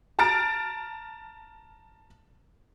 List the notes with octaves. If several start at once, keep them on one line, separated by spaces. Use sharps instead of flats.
A5 A#5 F6 A6 D7